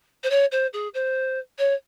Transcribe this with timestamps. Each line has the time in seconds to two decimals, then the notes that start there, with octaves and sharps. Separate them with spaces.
0.23 C5
0.30 C#5
0.52 C5
0.73 G#4
0.94 C5
1.58 C#5